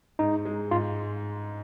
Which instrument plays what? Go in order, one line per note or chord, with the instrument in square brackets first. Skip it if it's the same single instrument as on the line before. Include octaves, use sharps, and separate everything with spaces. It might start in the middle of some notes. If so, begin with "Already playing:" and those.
[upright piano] G#2 [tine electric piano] D#4
[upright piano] G#3
[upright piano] G#2 [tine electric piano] F4